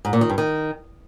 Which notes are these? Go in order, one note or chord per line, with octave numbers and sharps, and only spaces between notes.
G#2
A#2
D#3
G2
D#3